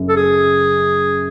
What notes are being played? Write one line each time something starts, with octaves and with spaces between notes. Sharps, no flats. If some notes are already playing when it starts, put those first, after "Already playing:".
Already playing: F#1 F#2 C#3
A4
G#4